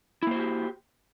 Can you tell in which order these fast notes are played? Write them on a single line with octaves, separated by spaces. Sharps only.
E4 A#3 C5 F#4 G4